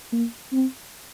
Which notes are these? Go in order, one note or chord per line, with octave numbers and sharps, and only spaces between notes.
A#3
C4